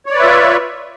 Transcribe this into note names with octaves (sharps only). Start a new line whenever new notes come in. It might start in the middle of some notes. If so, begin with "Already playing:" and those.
F4 B4 C#5 D5 E5